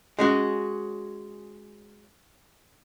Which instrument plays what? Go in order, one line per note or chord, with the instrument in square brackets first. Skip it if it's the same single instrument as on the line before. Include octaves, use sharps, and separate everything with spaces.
[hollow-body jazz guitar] G#3 C#4 F#4